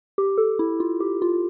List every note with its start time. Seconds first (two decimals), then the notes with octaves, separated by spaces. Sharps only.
0.18 G4
0.38 A4
0.59 E4
0.80 F4
1.00 G4
1.22 F4